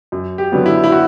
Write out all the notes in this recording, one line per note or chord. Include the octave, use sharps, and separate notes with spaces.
F#2
G4
D3 F#3 B3
E4
E4
F#4